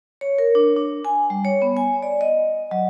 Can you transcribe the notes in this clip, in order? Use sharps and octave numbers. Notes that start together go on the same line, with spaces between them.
C#5
A#4
D4
D4
G#5
G3
C#5
B3
G#5
D5
D#5
F#3